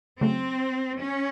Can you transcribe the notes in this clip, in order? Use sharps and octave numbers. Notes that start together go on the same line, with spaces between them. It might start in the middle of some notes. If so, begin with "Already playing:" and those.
C#3 F#3 A3 C4
C#4